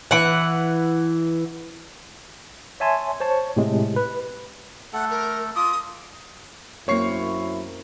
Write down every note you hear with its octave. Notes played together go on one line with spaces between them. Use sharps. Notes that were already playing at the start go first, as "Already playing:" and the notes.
E3 F#5
C#5 E5 G#5 A5 C6
C5 C#5 A5
A2 C3 G#3
B4
A3 A4 F#5
A#4
F4 D6 D#6
F#2 A#3 C4 E4 C#5 C#6 C7